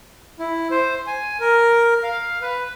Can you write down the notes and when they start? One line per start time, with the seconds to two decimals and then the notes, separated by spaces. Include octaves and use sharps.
0.40 E4
0.71 C5
1.07 G#5
1.40 A#4
2.03 F5
2.42 B4